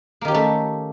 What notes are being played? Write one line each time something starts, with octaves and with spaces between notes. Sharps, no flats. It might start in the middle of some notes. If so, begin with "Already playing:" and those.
D#3 A3 A#3 C#4 G4